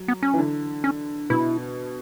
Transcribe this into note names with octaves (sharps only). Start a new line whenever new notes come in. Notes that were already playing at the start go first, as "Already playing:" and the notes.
Already playing: F#3
B3
C#4
E3
D3
C#4
B2 E4